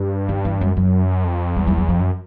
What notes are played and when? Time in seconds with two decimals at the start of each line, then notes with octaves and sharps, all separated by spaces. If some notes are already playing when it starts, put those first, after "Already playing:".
Already playing: G2
0.29 D#3
0.45 E3
0.60 F#2 G3
0.77 F#2 F#3
1.24 F2
1.56 E2 G3
1.67 G3
1.78 F#3
1.89 F2 F3
2.00 F#2